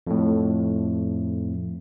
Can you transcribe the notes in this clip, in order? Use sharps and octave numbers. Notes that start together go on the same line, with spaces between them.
F2 A2